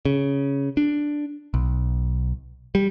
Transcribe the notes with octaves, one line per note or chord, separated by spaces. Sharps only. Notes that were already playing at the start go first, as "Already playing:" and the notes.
C#3
D4
B1
G3